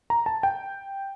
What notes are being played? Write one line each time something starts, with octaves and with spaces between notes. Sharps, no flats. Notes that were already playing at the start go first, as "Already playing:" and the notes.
A#5
A5
G5